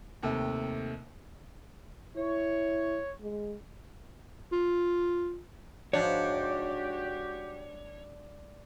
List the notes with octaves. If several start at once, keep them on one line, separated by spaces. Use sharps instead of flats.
D#2 C3 A3
E4 C#5
G#3
F4
G#2 F3 D4 D#4 F#4 G4 C#5